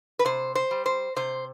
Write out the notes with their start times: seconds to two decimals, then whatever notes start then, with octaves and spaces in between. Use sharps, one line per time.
0.19 B4
0.25 C3 C5
0.55 C5
0.71 G3
0.86 C5
1.16 C3 C5